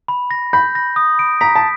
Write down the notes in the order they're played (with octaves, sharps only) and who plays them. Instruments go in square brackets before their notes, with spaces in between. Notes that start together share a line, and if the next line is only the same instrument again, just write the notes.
[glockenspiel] B5
A#6
[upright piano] B5 [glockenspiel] G6
[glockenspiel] A#6
D#6
D7
[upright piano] A#5 [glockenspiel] B6
[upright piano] A5